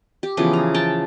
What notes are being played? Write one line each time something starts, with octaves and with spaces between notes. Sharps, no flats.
G4
C#3 E3 F3 B3
A#5
G5 A5 A#5